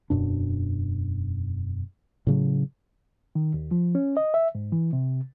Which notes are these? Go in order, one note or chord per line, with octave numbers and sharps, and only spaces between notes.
E1 F#2 B2 D4
A2 C#3 F#3
D#3
D#2
F3
C#4
D#5
E5
G#2
E3
C3